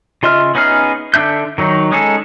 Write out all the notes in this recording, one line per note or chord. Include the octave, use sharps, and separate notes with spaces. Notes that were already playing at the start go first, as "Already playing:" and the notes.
C#3 F4 D#5 E5 F6
B3 C#4 D#4 G#4 F6
D3 D4 E5 G6
D#3 F#3 D#4
G#3 C#4 D#4 G#4 A4